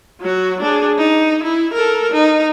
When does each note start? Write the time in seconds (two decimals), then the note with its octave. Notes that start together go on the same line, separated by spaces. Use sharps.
0.21 F#3 F#4
0.61 D4 G#4
0.98 D#4
1.43 E4
1.73 A4 A#4
2.12 D#4